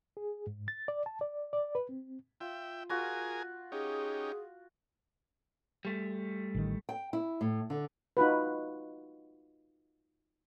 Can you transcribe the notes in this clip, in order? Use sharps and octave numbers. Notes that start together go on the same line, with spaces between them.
G#4
G#2
A6
D5
A5
D5
D5
B4
C4
F4 E5 G5
F4 F#4 G#4 A#4 G#5
C#4 D#4 G4 G#4
G3 A3
A1 D#3
G5
E4
A2
D3
D#4 F4 F#4 B4